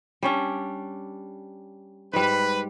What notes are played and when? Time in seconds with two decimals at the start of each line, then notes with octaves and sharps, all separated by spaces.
0.23 G3 C#4 D4
2.13 G#2 G3 B4